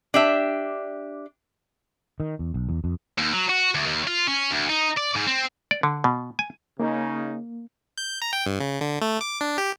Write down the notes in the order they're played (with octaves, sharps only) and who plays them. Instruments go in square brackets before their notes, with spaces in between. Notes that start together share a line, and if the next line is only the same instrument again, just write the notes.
[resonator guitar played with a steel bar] D4 G4 E5
[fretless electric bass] D#3
E2
B1
E2
F2
[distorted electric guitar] D#2
F#3
F#4
D2
D#2
F4
C#4
D2
D#4
D5
G#2
C4
[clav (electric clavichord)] D5
D3
B2
G#5
[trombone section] C#3 D#4 [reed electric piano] A#3
[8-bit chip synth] G6
A#5
G5
G2
C#3
D3
A3
D6
D4
G4